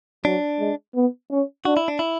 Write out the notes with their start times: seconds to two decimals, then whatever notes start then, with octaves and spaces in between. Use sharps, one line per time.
0.25 F#3 D4
0.60 G#3
0.95 B3
1.31 C#4
1.65 D4 F#4
1.77 E4
1.88 D4
1.99 E4